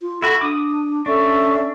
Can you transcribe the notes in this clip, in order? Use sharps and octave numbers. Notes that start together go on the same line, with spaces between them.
F4
E4 F#4 A4 B5
D4 D6 D#6
C#4 D4 A4 E5 C#6